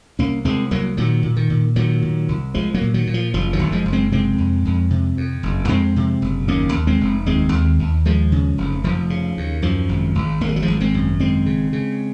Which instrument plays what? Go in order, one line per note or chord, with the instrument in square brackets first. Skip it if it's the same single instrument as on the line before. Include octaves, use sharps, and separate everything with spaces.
[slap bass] C2 A#3 C#4
C2 G#3 C4
C2 F#3 A#3
A#2 D#3 F#3
A#2
D#3
A#2
A#2 D#3 F#3
A#2
C2
C2 F3 G#3
F#3 A#3
A#2
D#3 F#3
A#2
F3
F#1 F3
D#3 F#3
F#1
F3 G#3
F#1
G#3 C4
C3 G#3 C4
F2
F2
C3
F2
F#1
F2 G#3 C4
C3
F#1
D#2 A#3 C#4
D#2
G#3 C4
F1
D#2 G#3 C4
D#2
D#2
D#2 F3 G#3
C#3
F1
F1 F3
C#3
D#2
F#2 F3
G#1
G#1
G#1 A#3
G#3
F#3
F3 G#3
G#1
G#3 C4
F#2
G#1 G#3 C4
C#3
C#3